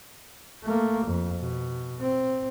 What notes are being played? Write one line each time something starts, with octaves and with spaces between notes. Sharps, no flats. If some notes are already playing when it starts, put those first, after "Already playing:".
A3 A#3
F2
B2
C4